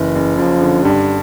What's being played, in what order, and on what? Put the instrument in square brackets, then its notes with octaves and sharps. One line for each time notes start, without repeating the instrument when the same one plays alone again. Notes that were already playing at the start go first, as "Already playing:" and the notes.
Already playing: [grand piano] F#1 [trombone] E3
[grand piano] F#1
[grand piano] F#2 [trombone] F3
[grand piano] D3
[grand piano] G2 [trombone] G3